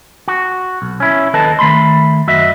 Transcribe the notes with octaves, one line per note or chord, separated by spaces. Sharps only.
F#4
B1
C#4 E4
D#2 A4 B4 D#5 A5
D#3 A3 B5 C6
F#2 F#4 D#5 E5